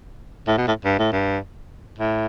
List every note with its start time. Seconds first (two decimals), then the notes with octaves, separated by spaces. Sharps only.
0.47 A2
0.58 B2
0.68 A2
0.85 G2
0.99 A2
1.12 G2
1.99 A2